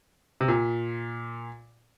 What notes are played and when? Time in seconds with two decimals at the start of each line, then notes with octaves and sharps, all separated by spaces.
0.41 C3
0.48 A#2